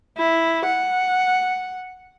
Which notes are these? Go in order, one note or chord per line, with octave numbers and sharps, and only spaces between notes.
E4
F#5